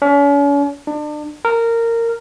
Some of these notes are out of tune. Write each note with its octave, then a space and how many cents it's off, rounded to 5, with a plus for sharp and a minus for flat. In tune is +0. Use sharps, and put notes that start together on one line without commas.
C#4 +40
D4 +35
A#4 -15